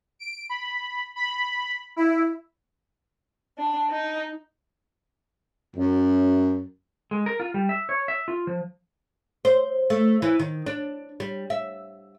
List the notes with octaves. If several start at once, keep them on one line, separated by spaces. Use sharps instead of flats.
D7
B5
B5
E4
D4
D#4
F#2
G#3
A#4
F4
G3
E5
C#5
E5
F4
F3
C5
A3
E3
D#3
D4
G3
E5